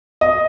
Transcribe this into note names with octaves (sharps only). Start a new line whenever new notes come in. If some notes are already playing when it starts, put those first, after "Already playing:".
D#5